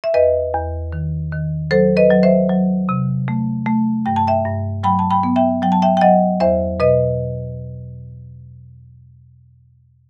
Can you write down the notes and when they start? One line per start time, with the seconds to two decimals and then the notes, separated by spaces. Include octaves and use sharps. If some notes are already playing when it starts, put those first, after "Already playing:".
0.04 E5
0.14 E2 B4 D#5
0.54 E2
0.92 D#3
1.32 D#3
1.71 F#3 A4 C5
1.97 B4 D#5
2.11 F#3
2.23 C5 E5
2.49 F#3
2.89 C3
3.28 A3
3.66 A3
4.06 G2 G5
4.16 A5
4.28 E5 G5
4.45 G2
4.83 F#3 G5 B5
4.99 A5
5.10 G5 B5
5.23 B3
5.36 E5 G5
5.62 F#3 G5
5.72 A5
5.82 E5 G5
5.97 G5
6.01 F#3 D#5 F#5
6.40 E2 C5 E5
6.80 B2 B4 D#5